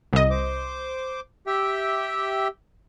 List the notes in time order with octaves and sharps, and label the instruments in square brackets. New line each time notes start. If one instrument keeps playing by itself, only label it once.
[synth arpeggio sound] C2 D#5
[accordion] C5 D6
G4 E5 G5